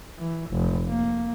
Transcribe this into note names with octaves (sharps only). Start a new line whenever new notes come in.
E3
F1
A#3